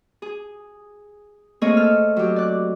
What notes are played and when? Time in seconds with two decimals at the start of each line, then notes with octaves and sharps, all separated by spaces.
0.22 G#4
1.61 A3 A#3 C4 G#4 C#5 D#5
1.77 A4 F6
2.16 F#3 G4
2.36 D5 F#6